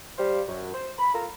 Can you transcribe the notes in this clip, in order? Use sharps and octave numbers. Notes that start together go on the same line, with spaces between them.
G3 C5 F5
F#2
C5
B5
F4 A4 A#4 A#5